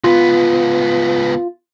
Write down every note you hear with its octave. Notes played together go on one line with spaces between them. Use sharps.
C#2 B3 F4